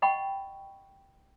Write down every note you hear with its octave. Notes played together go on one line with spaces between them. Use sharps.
D#5 F#5 G5 B5 C#6